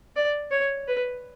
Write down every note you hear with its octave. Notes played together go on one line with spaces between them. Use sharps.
D5
C#5
B4